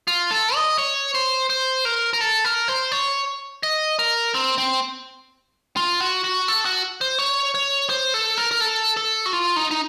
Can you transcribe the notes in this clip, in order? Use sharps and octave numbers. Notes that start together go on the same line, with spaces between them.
F4
A4
D#5
C#5
C5
C5
A#4
A#4
A4
A#4
C5
C#5
D#5
A#4
C4
C4
F4
F#4
F#4
A4
F#4
C5
C#5
C#5
C5
A4
A#4
A#4
A4
A4
F#4
F4
D#4
D#4